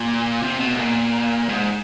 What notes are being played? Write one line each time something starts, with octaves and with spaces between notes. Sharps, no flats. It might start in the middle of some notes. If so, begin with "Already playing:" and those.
Already playing: A#2
C3
B2
A2
A#2
G#2